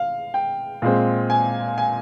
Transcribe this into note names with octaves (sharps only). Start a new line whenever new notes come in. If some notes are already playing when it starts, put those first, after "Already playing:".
Already playing: F5
G5
A#2 G#3 C4
G#5
G#5